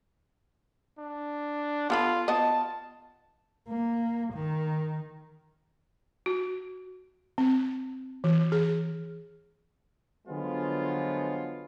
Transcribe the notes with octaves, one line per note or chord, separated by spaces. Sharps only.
D4
B3 F4 A4 B5
F3 B3 D#5 A5
A#3
D#3
F#4
C4
E3
G#4
D3 F3 F#3 G#3 B3 F4